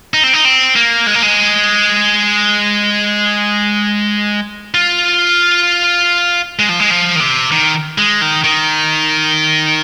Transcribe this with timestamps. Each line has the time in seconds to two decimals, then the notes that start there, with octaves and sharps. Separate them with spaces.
0.14 D#4
0.24 C4
0.33 D#4
0.45 C4
0.76 A#3
1.07 G#3
1.14 A#3
1.22 G#3
4.74 F4
6.59 G#3
6.69 F3
6.80 G#3
6.91 F3
7.16 D#3
7.20 C3
7.52 D#3
7.98 G#3
8.21 D#3
8.44 D#3